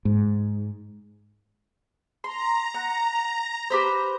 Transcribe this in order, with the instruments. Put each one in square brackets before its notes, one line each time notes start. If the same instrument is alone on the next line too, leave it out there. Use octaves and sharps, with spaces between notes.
[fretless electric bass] G#2
[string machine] A#5 [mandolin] C6
[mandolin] F#5
G4 B4 C5